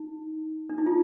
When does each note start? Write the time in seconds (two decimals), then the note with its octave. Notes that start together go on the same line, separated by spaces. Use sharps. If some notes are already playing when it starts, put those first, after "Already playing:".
Already playing: D#4
0.70 D4
0.78 D#4
0.86 F4